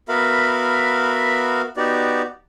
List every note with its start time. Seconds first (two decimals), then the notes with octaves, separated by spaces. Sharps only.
0.09 B3 F#4 A#4 E5 F5 B5
1.77 B3 D#4 F#4 G4 D5